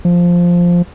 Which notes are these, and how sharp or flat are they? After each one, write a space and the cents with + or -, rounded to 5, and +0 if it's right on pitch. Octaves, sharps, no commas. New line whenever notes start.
F3 +0